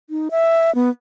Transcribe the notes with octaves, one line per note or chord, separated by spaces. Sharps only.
D#4
E5
B3